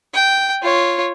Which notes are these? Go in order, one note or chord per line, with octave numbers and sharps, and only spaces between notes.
G5
F4 C#5